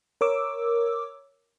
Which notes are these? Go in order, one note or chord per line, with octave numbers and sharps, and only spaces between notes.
A#4 C#5 D6 E6